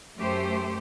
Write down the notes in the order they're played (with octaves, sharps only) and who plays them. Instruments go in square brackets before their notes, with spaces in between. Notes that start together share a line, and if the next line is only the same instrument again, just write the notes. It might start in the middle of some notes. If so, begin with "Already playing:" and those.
[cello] F#2 [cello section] A3 G4 C5